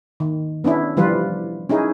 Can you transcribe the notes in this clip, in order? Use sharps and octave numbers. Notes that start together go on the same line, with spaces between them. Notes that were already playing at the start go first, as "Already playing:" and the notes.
D#3
B3 C#4 D4 E4
E3 F3 G3 F4 B4
C#4 D#4 E4 G#4